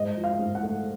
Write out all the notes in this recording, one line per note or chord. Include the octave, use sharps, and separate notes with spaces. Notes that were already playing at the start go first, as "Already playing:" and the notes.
Already playing: G#2 D#5
F3
F5
G#2
F#5
A3